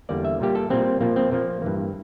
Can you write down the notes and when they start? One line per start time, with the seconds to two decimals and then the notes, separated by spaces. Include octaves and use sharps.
0.09 E2 D3 G3 A#3 D5
0.25 E5
0.40 A#2 G3 A#3 G4
0.55 A4
0.70 A#2 G3 A#3 C4
1.01 A#2 F3 A#3
1.16 C4
1.31 A#2 F3 A#3
1.62 G2 E3 A#3